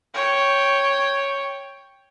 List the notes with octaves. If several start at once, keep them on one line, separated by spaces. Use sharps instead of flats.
C#5 G5